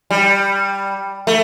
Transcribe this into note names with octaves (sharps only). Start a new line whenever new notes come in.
G3
A3